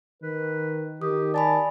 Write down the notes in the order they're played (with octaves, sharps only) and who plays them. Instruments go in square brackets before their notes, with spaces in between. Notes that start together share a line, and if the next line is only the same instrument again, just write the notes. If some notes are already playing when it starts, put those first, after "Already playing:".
[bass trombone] D#3 [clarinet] B4
[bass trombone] D#3 [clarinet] G4 [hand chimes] D#6
[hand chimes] D5 G#5 B5 [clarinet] A5